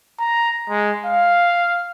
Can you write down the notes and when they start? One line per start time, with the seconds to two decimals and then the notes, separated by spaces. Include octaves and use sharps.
0.19 A#5
0.69 G#3
1.06 F5